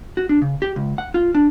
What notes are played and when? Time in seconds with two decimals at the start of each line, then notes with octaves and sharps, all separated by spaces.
0.17 F#4
0.29 D4
0.42 C#3
0.62 G4
0.76 C#2
0.98 F#5
1.14 F4
1.35 D4